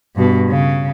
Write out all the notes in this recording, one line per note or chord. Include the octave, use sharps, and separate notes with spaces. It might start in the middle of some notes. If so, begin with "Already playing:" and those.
G2 B2
C#3